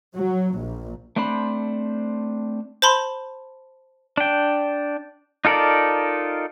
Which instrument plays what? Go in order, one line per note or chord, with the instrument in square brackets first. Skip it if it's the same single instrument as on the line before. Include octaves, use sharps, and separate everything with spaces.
[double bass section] F#3
A#1
[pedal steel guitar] A3 C4 D4 C5 B5
[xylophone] C5 A5 B5 C6
[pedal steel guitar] D4 G5
D#4 F4 A4 A#4 D5